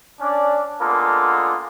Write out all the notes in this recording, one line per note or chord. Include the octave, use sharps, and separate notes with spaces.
C#4 D4 D5
G#3 A#3 B3 D4 F4 A4